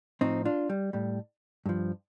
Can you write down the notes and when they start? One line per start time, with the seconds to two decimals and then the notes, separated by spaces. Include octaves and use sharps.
0.21 A2 F3 C4 D#4
0.45 D4 F4
0.69 G3
0.93 A2 G3
1.66 G2 F3